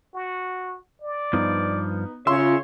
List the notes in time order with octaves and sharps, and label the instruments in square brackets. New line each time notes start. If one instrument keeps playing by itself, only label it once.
[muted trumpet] F#4
D5
[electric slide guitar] G2 F3 [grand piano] B3 D#4
[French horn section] C#3 F4 [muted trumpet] C#5 [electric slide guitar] E5 [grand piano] C6